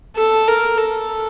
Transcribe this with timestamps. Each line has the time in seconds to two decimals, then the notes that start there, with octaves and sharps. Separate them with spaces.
0.17 A4
0.48 A#4
0.78 A4